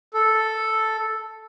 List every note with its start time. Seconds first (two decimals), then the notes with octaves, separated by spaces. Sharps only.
0.14 A4